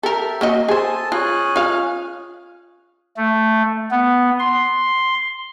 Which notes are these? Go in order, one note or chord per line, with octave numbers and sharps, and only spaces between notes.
G4 A4 A#4 E5
A#3 F#4 D#5
G#4 A4 C5 A5 D#6
C#4 F4 G#4 F#6
F4 F5
A3
B3
C6